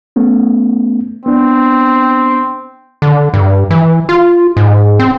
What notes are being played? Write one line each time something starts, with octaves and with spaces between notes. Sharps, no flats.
A3 B3 C#4
B3 C4 D4
D3
G2
E3
F4
G#2
C4